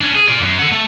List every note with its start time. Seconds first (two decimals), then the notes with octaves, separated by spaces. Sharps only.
0.01 C#4 D4
0.14 G#4
0.29 F4 D5
0.42 F#2
0.59 A4 F#5
0.72 A3